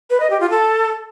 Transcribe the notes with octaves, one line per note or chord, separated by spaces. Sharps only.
B4
D#5
G4
F4
A4